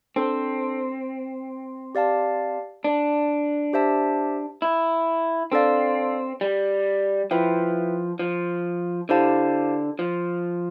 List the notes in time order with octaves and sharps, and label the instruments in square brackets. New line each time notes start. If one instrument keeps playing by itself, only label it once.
[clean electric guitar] C4 [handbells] D4 A4 C5
[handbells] G4 D5 F5 A5
[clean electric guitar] D4
[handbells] G4 C5 E5 A5
[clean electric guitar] E4
[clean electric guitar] C4 [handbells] D4 A4 D5 F5
[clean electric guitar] G3
[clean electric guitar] F3 [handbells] E4 B4 E5 G5
[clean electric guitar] F3
[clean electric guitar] D3 [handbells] E4 G4 C5 F5 A5
[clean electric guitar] F3